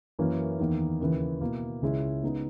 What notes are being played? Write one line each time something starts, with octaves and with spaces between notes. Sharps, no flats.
F#2 E3 A#3 C#4 E4
E2 D#3 A#3 D#4
D#2 C#3 E3
B2 A#3 E4
C#2 C#3 G#3 C#4 E4
C#3 G#3 B3 D#4